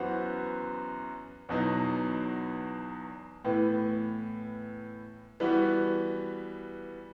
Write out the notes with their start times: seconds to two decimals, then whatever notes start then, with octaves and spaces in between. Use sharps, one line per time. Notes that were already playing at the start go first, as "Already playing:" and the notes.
Already playing: F#2 E3 B3 F#4 C5
1.49 E2 B2 F#3 B3 D#4
3.45 A2 E3 B3
5.40 E3 G3 B3 F#4